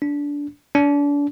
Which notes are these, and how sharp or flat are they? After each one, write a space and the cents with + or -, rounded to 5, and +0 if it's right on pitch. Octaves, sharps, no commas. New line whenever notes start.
D4 -20
D4 -35